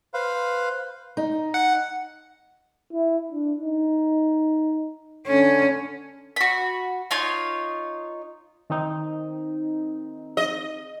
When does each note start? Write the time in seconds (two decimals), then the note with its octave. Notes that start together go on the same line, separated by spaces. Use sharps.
0.14 B4 C5 F5
1.17 D#4
1.54 F#5
2.93 E4
3.31 D4
3.61 D#4
5.27 D3 C#4
6.36 F#4 B5
7.11 D#4 F4 C#5
8.70 D#3 C4 D#4
10.37 D#5